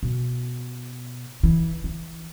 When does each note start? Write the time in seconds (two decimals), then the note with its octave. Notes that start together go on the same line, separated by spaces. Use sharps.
0.03 B2
1.43 E3
1.84 E3